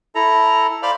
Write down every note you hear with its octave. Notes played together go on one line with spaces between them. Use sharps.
E4 A4 A#5
C5 D5 F5 B5 F6